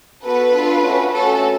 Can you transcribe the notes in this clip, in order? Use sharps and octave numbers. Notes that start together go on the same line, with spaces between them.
B3 F#4 A4 B4
D4 F4 A4
A3 C#4 F#4
A3 C#4 F#4 A4